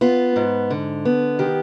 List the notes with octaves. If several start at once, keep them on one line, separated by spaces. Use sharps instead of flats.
B3 F4
G#2
D3
B3
D#3 G4